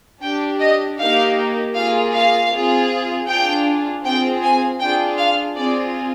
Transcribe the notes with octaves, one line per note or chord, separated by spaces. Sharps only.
D4 G4 G5
D#5
A#3 D#4 G4 F5
A#3 F4 G#4 F5
F5
C4 F4 G#4
D4 F4 G#4 G5
C4 F4 G#4 G5
G#5
D4 F4 G#4 G5
F5
C4 F4 G#4 D5